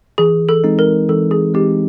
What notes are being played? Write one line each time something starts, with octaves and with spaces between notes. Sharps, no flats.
E3 G#4
A4
G#3 C4 D#4
A#4
E3 A4
G#4
G#3 C4 D#4 G4